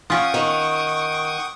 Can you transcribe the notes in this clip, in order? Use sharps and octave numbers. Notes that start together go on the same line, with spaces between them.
C#4 F4 F#5 G5 C#6 D#6
D#3